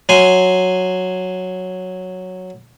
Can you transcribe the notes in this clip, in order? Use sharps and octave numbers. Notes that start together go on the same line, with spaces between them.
F#3 G#5 C6